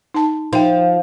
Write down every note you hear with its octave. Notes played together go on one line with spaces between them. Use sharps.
D#4 A5
F3 D#4 E5 G5